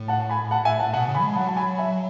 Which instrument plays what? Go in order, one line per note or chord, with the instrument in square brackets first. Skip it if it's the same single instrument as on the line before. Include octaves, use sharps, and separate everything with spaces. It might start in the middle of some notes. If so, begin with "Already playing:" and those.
Already playing: [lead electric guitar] A2
[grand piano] F#5 A5
G#5 B5
F#5 A5
E5 G#5
F#5 A5
[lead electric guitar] B2 [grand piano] F#5 A5
[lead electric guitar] C#3
[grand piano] G#5 B5
[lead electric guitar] G#3
[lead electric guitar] F#3 [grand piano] F#5 A5
[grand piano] A5
G#5 B5
E5 G#5